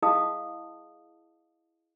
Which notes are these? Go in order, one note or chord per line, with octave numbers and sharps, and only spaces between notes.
E4 G#4 D#5 F5 A5 D#6